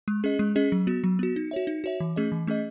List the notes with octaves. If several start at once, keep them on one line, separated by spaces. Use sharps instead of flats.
G#3
C#4 G#4 D#5
G#3
C#4 G#4 D#5
F#3
B3 F#4
F#3
B3 F#4
D#4
F#4 C#5 E5
D#4
F#4 C#5 E5
E3
A3 C#4 G#4 D#5
E3
A3 C#4 G#4 D#5